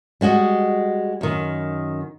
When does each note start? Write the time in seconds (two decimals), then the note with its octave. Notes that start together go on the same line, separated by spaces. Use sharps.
0.21 G3 G#3 F#4 D#5
1.21 F#2 D#3